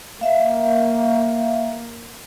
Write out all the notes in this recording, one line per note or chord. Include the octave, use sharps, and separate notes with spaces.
A#3 E5 F5